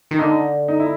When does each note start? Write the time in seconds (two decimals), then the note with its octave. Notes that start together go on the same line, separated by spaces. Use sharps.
0.11 D#3
0.19 D3 D#4
0.68 D#4
0.80 E4